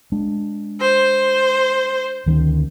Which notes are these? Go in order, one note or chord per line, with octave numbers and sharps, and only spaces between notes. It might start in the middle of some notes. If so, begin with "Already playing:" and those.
G#3 D4
C5
D2 D#3 C#4